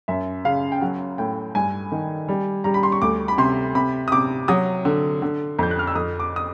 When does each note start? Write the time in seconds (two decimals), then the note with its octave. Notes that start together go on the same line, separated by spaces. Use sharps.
0.08 F#2 E5
0.45 C#3 F5
0.72 G5
0.82 F#3 F#5
1.18 A2 G5
1.55 G2 G#5
1.92 D#3
2.28 G3
2.64 G3 A#5
2.74 B5
2.83 C6
2.92 C#6
3.02 D2 D6
3.28 B5
3.38 C3 C6
3.75 C3 B5
4.08 D#6
4.12 C3 D6
4.48 F#3 D#6
4.85 D3
5.22 D3
5.59 F2 G6
5.71 F#6
5.79 F6
5.87 E6
5.95 F2 D#6
6.20 D6
6.36 D#6